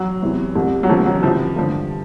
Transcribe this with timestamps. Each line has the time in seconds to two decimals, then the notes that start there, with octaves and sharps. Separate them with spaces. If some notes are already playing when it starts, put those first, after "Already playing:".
Already playing: F#3
0.22 E2 C3 E3
0.55 C2 C3 F3
0.83 F#3
0.89 D#2 C#3 F3
1.06 F#3
1.23 C#2 C3 E3 F3
1.56 G2 D3 F3